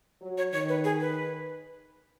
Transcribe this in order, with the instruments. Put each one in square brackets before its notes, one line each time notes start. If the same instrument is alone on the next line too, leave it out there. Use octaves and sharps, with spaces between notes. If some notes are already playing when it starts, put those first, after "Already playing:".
[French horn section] F#3
[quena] C#5
[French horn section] D#3 [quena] C#5
[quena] B4
G#4
B4